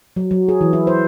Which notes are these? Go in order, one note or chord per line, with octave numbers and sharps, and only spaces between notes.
F#3
F#3
G#4
E3
E4
C5